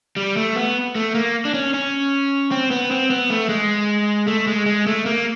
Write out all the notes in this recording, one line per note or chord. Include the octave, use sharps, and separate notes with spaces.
G3
A3
B3
A3
A#3
D4
C#4
C#4
C4
B3
C4
B3
A3
G#3
A3
G#3
G#3
A3
A#3